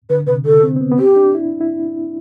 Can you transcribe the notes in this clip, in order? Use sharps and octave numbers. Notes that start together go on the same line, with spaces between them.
D3 B4
C3 B4
D3 A4
C4
C4
B3
B3
C4 G4
D4
E4
E4